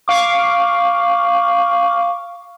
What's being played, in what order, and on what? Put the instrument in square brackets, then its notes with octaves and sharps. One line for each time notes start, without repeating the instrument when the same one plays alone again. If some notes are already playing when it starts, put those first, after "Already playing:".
[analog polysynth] F5 C#6 D6